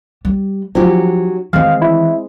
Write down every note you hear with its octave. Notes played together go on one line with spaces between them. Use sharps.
G3
F3 F#3 C#4 D#4 G4
D#3 E3 G#3 C4 F5
E4